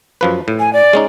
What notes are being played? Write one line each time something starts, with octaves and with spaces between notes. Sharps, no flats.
F#2 F3 B4
A2
G#5
D5
G#3 C#4 D#4